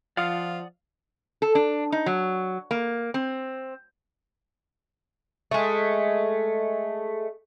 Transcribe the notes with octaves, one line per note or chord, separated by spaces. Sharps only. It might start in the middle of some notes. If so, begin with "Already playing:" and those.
F3 F4 D5 F5 F#5 D#6
A4
D4
D#4
F#3
A#3
C4
G#3 A3